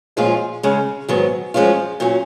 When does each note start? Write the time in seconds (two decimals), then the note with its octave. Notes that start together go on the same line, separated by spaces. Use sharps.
0.17 A#2 F3 G#3 C#4 F4
0.63 C#3 G#3 C#4
1.09 G#2 D#3 F#3 B3
1.54 F#2 F3 G#3 C#4 F4
2.00 A#2 F#3 C#4